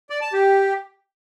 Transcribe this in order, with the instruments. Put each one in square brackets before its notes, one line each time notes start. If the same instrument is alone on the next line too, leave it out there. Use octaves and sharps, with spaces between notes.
[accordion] D5
A5
G4